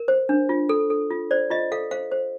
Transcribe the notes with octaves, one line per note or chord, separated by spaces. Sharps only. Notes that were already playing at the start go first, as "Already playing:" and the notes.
Already playing: A#4
C5
D4
F4
A4
A4
F4
C5 D5
F4 D#5
A4 F5
C5 F5
C5